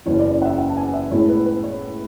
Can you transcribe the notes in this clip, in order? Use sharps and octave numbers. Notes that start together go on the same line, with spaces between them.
F#1 E2 C#3 E3 C#5
D5
C#5
D5
F#5
E5
F#5
A5
G#5
E5
A2 G#3 B3 E4 C#5
B4
B4
C#5